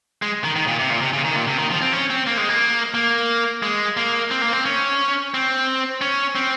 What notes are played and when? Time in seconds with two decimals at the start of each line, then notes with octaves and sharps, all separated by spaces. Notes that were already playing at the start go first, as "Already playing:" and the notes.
0.22 G#3
0.44 D#3
0.56 D#3
0.67 A#2
0.79 C3
0.90 A#2
1.01 C3
1.13 C#3
1.25 D#3
1.36 A#2
1.47 C3
1.58 D#3
1.70 F3
1.82 C4
1.93 C#4
2.10 C4
2.27 A#3
2.37 G#3
2.49 A#3
2.94 A#3
3.63 G#3
3.97 A#3
4.31 C4
4.42 A#3
4.53 C4
4.66 C#4
5.34 C4
6.01 C#4
6.35 C4